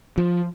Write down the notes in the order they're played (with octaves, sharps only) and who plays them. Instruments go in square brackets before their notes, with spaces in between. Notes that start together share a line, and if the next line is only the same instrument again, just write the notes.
[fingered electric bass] F3